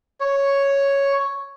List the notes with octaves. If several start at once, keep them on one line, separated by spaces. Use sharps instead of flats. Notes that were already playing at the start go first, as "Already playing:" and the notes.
C#5